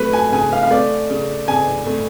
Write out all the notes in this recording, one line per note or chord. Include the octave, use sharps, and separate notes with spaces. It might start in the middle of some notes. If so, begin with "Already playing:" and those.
Already playing: F#3 A3 B4
G#5
C#3 G#5
F5
F5
A3 D5
C#3
C#3 G#5
A3